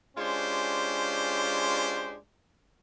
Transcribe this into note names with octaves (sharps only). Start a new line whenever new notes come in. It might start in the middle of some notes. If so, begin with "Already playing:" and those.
G#3 C#4 D4 F4 G4 C5